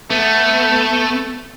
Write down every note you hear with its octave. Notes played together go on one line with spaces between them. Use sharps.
A3 B3